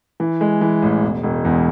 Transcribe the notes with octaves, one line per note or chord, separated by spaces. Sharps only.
E3
G#3
E3
A1
E1
E1
E2